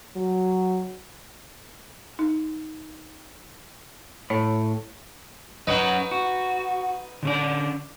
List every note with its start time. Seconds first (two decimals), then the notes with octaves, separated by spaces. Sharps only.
0.16 F#3
2.19 D#4
4.30 A2 C#5
5.67 F#2 D#4 B4 C#5 D#5 F#5
6.11 F#4
7.23 D3 C#4 D5